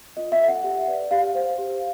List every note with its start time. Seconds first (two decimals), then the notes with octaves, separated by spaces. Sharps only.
0.16 F4 D#5
0.32 E5
0.40 A4 C#5
0.48 F#5
0.63 G4
0.88 B4 D5
1.11 G4 F5
1.35 C5
1.58 G4